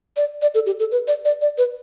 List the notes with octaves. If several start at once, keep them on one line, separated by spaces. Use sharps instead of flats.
D5
D5
A4
G4
A4
B4
D5
D5
D5
B4